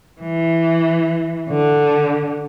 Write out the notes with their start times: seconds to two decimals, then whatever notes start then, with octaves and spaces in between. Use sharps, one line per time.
0.21 E3
1.50 D3